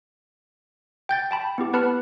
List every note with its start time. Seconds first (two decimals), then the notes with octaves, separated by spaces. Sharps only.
1.09 G5 G6 A6
1.31 G5 A5 B5
1.58 B3 E4 G4
1.73 B3 B4 A5 B5 F6 C#7